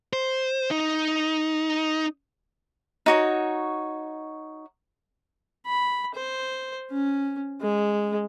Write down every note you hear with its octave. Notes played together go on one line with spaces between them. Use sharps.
C5
D#4
D#4 F#4 C#5
B5
C5
C#4
G#3